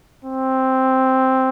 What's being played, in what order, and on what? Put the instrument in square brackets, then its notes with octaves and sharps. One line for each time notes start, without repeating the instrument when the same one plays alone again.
[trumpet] C4